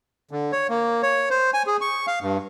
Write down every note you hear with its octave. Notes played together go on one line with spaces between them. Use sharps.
D3
C#5
A#3
C#5
C5
G#5
G#4
C#6
F5
G2